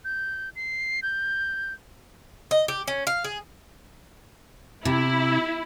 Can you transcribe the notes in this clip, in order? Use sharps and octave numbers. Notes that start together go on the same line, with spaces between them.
G6
C7
G6
D#5
G4
C#4
F5
G#4
C3 E4